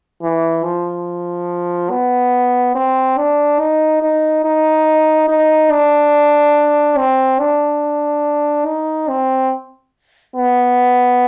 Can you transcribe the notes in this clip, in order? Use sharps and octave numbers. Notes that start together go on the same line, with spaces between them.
E3
F3
B3
C4
D4
D#4
D#4
D#4
D#4
D4
C4
D4
D#4
C4
B3